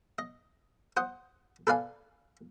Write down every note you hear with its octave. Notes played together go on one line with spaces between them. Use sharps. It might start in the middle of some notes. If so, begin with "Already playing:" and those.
D#5
C5 F#5 D#6
A4 B4 D5 F5 G#5